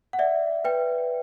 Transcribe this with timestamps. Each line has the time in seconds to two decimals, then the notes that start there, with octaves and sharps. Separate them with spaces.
0.13 F#5
0.19 D5 E5
0.65 B4 G5